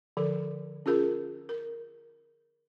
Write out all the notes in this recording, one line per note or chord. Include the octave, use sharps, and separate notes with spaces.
D3 F3 A4
C#4 F4 G#4 A#4
A#4